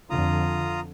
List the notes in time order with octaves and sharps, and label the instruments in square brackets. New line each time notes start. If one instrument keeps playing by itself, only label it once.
[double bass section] F2 D3 [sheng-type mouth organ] F4 A#5 D#6